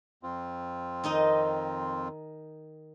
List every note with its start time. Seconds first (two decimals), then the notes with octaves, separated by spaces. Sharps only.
0.23 F2 C4 F4
1.04 D#3 D#4 D#5